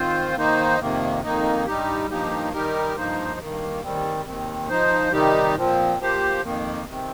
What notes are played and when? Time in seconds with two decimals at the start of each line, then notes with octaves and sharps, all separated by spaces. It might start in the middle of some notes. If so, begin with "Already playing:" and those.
Already playing: D#3 C4 F4 C5
0.36 D#3 A#3 D#4 C5
0.79 F2 C3 D#3 A#3
1.23 F2 D#3 A#3 D#4
1.66 G2 G3 D#4 G4
2.09 G2 F3 A#3 D#4 G4
2.53 D#3 G3 D#4 G4 A#4
2.96 G2 F3 A#3 D#4 C5
3.39 G2 D#3 A#3
3.83 D#2 D#3 G3 C4
4.26 D#2 D#3 C4
4.69 F3 D#4 C5
5.12 C3 D#3 G3 D#4 G4
5.55 A#2 F3 C4
5.99 F3 A#3 G4 C5
6.42 F2 D#3 A#3
6.85 C3 D#3 C4